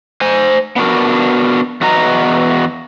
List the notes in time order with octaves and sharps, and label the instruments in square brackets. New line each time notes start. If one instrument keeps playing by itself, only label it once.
[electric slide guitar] C5 G#5
B3 D4 F#4 A#4
E2 B3 F#4 D#5 A#5